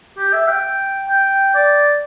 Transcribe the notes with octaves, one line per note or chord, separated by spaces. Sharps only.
G4
E5
G5
G5
D5